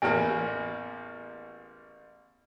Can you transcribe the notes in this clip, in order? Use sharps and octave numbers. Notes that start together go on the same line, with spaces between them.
A1 E2 A#3 G#5